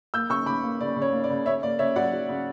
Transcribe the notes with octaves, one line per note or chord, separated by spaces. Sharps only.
A#3 E6 G6
C#3 C#6 E6
C#3 B5 D6
A#3
C#3 D5
C#3
C#5
A#3
D5
C#3
C#3 C#5 E5
A#3 D5
C#3 C#5 E5
F#3 D5 F#5
F#3
C#3